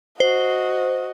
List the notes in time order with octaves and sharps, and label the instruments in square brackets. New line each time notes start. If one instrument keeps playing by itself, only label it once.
[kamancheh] F#4 D#5 [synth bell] C5